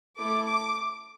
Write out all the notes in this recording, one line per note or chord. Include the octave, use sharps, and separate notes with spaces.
A3 E4 A4 D6
D6